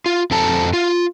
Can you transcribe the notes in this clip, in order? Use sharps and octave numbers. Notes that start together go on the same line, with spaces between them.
F4
F2 C4 A4 A5 A#5
F4